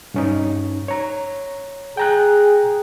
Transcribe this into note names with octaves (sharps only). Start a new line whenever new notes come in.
G2 C#4 D#4
C#5 A#5
G#4 G5 A#5 F#6